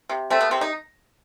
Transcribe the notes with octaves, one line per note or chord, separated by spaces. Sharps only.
C3
A3 C4
B3
C3 C4
D#4